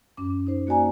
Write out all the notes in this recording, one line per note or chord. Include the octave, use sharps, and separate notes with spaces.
F#2 C#4 D6
D#4 C5
A#3 F#4 D5 G#5 A#5